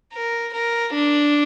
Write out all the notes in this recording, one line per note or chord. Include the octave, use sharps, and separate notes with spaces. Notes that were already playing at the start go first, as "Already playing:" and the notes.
A#4
A#4
D4